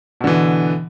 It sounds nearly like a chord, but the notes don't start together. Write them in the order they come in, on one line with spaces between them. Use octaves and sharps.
B2 D3 E3